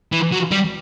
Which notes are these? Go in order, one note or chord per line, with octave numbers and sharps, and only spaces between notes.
E3
F#3
G3